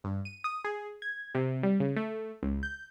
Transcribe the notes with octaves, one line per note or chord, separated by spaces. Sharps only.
G2
D#7
D#6
G#4
G#6
C3
G3
C#3
A3
C#2
G6